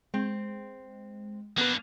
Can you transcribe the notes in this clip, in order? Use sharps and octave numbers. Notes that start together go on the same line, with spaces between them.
G#3 C4
A#3 B3 D4 B4